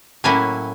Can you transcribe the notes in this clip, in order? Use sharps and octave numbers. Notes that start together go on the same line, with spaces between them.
A2 F#3 A#3 C#4 E4 G#5